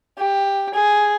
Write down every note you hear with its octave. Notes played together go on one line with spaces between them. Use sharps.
G4
G#4